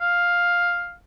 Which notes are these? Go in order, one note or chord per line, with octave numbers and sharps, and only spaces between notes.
F5